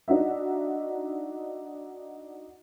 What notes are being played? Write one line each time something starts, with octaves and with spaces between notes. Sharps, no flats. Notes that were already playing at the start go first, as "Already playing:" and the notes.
D4 D#4 F#4 E5